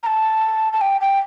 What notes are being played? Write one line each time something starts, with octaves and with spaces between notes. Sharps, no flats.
A#5
A5
A5
G5
G5